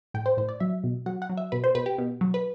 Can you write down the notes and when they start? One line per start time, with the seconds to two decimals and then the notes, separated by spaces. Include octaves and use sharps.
0.14 A2 G5
0.26 C5
0.37 A2 C5
0.49 D5
0.60 F#3 E5
0.84 B2
1.06 F#3 F#5
1.22 F#5
1.29 F#3
1.37 E5
1.52 B2 B4
1.64 C5
1.75 B2 B4
1.86 G4
1.98 B2
2.21 F#3
2.34 B4